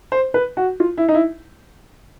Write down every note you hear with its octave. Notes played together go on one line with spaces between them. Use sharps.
C5
B4
F#4
F4
E4
D#4
E4